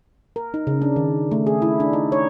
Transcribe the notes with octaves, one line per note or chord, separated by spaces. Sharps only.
A#4
D#4
C#3
D4
D#3
A3
G#4
E4
D4
D#4
C#5